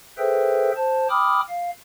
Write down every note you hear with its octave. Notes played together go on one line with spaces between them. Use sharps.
G#4 A4 B4 C5 E5 G5
C5 A5
G5 B5 D6 D#6 F6
F5